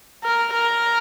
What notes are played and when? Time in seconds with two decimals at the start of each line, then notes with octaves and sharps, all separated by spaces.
0.24 A#4
0.53 A#4